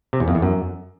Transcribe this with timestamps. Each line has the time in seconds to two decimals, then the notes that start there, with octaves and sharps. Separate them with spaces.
0.13 C3
0.20 E2
0.28 F2
0.35 E2
0.42 F#2